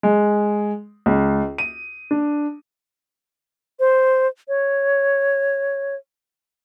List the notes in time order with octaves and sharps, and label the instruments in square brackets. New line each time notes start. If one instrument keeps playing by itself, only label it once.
[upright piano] G#3
C#2
D#7
D4
[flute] C5
C#5